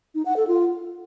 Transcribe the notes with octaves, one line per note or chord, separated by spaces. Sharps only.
D#4
F#5
A4
F4